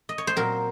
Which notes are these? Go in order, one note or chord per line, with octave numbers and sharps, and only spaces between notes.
D#5
C#5
C5
A#2 F#3 C4 A#4